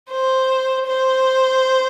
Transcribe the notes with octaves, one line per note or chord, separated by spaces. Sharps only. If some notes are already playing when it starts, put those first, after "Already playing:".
C5
C5